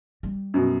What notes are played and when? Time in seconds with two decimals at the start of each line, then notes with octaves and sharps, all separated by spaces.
0.23 G3
0.54 F#2 B2